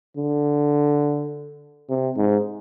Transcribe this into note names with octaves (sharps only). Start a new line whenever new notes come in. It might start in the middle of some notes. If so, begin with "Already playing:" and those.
D3
C3
G#2